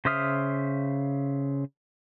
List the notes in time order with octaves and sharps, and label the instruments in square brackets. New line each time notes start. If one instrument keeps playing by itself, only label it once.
[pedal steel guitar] C#3 C5 E5 D#6 F6